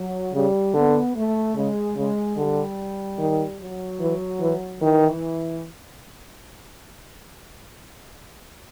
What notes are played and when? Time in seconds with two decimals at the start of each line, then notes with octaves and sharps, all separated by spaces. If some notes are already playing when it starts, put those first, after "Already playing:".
Already playing: F#3
0.33 C#3 G3
0.74 D3 B3
1.14 A3
1.55 C#3 G#3
1.96 C#3 G#3
2.37 D3 G3
3.18 D#3
3.58 F#3
4.00 E3
4.41 E3
4.80 D#3 E3